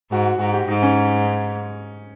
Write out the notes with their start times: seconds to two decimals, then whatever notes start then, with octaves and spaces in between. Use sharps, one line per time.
0.12 G#2 F#4
0.26 F#4
0.39 G#2 F#4
0.53 G4
0.67 G#2 D#4
0.82 C#4